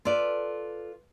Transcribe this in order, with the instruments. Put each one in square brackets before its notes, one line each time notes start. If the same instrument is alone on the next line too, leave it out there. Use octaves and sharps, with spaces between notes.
[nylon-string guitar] F4 A4 B4 D5